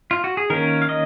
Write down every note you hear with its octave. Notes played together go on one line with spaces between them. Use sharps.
F4
F#4
G#4
D#3 A#3 C#4 A#4
F5
D#5